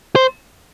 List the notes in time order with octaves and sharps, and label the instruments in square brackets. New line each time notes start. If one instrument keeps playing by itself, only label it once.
[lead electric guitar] C5